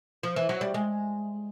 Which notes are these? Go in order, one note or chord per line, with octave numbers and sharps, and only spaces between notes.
F3
E3
F#3
G3
G#3